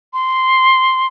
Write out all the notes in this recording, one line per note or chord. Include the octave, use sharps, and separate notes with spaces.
C6